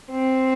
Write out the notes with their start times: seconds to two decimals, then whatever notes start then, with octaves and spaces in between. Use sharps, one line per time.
0.11 C4